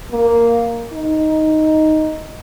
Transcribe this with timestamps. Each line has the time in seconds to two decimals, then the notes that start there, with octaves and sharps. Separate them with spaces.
0.12 A#3
0.93 D#4